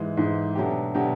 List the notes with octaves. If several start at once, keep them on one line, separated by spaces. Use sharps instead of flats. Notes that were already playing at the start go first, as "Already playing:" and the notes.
Already playing: G#2 E3 G#3
G#2 E3 G#3
B2 F#3 A3 D4 G4
B2 F#3 A3 D4 G4